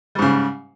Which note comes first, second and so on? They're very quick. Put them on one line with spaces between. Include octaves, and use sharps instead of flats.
G3 G#2 C#3